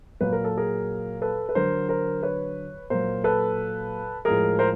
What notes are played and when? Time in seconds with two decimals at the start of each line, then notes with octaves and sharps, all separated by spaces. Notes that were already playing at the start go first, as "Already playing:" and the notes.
0.21 A#2 F#3 B4
0.33 A#4
0.44 A4
0.57 G#4 A#4
1.22 A4 B4
1.49 B4
1.55 D3 F#3 A#4 C5
1.89 A#4 C5
2.23 B4 C#5
2.90 A#2 F#3 A#4 C5
3.24 A4 B4
4.25 A2 F3 G#3 G#4 A#4
4.59 A#4 C5